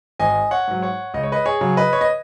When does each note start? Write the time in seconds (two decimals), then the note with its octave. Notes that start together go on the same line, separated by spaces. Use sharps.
0.20 G#1 D#5 G#5
0.51 C#5 F#5
0.68 G#2 F#3
0.82 C#5 F#5
1.14 C#2 D#5
1.23 C#5
1.32 B4 D#5
1.46 G#4 C#5
1.61 C#3 F#3
1.77 B4 D#5
1.93 C#5
2.01 D#5